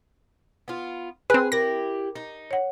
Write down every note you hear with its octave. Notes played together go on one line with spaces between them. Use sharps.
B3 F4
C4 G#4 B4 F#6
E4 G4 A#4 A#6
D#4
C#5 F#5